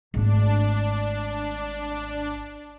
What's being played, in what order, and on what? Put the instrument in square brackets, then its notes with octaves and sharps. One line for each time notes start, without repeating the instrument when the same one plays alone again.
[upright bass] G#1 A3 [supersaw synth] D4